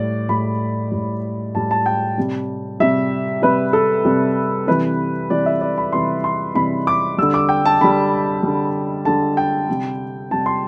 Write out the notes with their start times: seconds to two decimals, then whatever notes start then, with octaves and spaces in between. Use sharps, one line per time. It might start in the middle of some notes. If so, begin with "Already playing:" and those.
Already playing: A2 G3 D5
0.29 A2 G3 B5
0.91 A2 G3
1.55 A2 G3 A5
1.71 A5
1.86 G5
2.18 C3 G3
2.80 C3 G3 E5
3.42 C3 G3 B4
3.73 A4
4.05 C3 G3
4.67 C3 E3 G3 B4
5.30 C3 E3 G3 D5
5.46 E5
5.61 D5
5.78 B5
5.92 C3 E3 G3 C6
6.24 C6
6.55 C3 E3 G3 B5
6.87 D6
7.18 D3 G3 E6
7.34 D6
7.49 G5
7.65 A5
7.81 D3 G3 B5
8.43 D3 G3
9.05 D3 G3 A5
9.37 G5
9.69 C3 G3
10.31 C3 G3 A5
10.46 C6